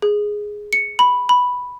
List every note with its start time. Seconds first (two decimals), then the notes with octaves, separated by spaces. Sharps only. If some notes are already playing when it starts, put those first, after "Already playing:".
0.02 G#4
0.73 C#7
0.99 B5
1.29 B5